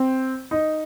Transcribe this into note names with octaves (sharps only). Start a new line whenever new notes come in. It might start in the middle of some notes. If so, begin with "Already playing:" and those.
Already playing: C4
D#4